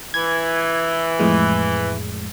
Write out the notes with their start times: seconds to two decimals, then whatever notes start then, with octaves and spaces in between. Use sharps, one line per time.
0.14 E3 G#6
1.19 F2 A2 G#3